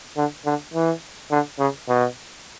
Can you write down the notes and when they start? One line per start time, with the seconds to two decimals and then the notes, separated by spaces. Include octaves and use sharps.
0.17 D3
0.46 D3
0.74 E3
1.31 D3
1.59 C#3
1.88 B2